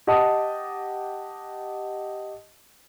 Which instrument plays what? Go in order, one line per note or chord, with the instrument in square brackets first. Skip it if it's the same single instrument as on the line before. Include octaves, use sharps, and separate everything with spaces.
[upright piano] G4 D#5 F#5 A5 D#6